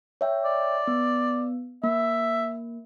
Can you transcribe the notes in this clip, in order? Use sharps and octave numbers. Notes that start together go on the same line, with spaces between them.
C#5 E5 G5
D5
B3
A#3 E5